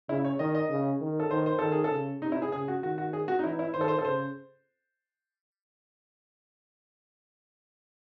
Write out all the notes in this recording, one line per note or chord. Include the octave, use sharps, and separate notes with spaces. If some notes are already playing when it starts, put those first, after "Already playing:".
C#3 E4
C#5
D#3 D#5
D#5
C#3
D#3
A4
D#3 C5
C5
D#3 A4
G#4
A4
C#3
C3 D#4
E4
G#4
C#3 G#4
F#4
D#3 F#4
F#4
G#4
F#4
D#4
E3 E4
E4
D#3 C5
A4
C5
A4
C#3 C5